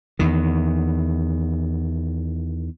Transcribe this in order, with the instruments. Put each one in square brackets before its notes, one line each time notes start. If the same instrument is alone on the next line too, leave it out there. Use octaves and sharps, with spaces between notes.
[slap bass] E2 D#3